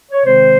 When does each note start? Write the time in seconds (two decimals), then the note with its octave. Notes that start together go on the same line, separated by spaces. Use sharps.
0.12 C#5
0.25 C3 D#3 G#3 C4 C5